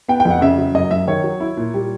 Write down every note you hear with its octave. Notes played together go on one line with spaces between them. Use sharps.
B3 G5
G5
F2
F#5
C#3 E5
F#3
F#2 D#5
F#2 E5
D#3 C#5
F#3
E4
A#2
G3